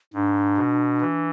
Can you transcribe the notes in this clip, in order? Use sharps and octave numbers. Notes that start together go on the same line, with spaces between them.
G#2 D4
B2
E3